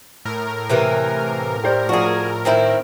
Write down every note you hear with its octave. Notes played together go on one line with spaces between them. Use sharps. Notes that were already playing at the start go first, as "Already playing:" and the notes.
A2 A#4
C3 E3 A#3
G4 C5 D5
F3 F#4 G#4 D5
D#3 C4 E4